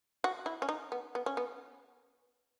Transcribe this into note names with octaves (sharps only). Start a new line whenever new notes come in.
F#4
E4
C#4
D#4
B3
B3
C#4
B3